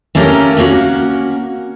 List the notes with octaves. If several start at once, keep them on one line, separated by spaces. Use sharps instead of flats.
A3 A#3 C#4 G4 A#4
A#3 C#4 F#4